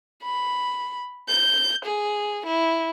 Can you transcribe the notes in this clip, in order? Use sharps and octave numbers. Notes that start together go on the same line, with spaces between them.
B5
G6
G#4
E4